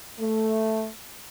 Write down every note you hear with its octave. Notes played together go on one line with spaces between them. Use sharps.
A3